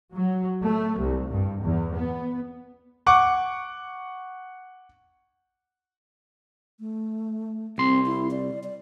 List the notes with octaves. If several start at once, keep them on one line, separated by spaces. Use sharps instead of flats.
F#3
A3
C2
G2
E2
B3
F#5 C#6 D6
A3
C2 C4 C6
E4
D5
D5